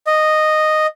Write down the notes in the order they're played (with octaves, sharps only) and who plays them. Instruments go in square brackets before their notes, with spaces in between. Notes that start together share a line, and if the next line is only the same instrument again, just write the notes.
[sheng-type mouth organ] D#5